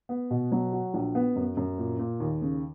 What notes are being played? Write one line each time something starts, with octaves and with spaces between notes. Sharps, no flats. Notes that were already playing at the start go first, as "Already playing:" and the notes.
B3
B2
F#3
F#4
A#1
B3
F#2
F#2
A#2
A#2
D#2
C#3